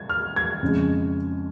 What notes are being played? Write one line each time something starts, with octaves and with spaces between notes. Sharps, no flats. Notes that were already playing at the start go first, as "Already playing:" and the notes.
Already playing: G#6
F6
G#6
F2 C#3 G#3